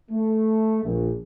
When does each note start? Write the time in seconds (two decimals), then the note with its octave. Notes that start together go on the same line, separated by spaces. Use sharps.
0.10 A3
0.83 A#1